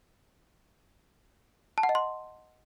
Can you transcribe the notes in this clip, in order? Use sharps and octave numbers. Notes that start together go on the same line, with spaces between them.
A5
F#5
D#5
C6